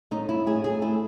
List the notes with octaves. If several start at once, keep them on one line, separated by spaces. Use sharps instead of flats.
A2 D#4
E4
A2 G#4
G#4
A3 E4